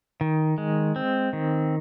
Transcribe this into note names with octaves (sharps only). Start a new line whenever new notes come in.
D#3
G#3
C4
D#3